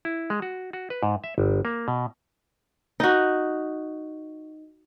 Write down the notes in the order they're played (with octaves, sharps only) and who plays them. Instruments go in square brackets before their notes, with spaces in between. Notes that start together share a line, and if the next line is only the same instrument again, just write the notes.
[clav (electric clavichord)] E4
G#3
F#4
F#4
B4
G#2
E5
G1
A#3
B2
[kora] D#4 F#4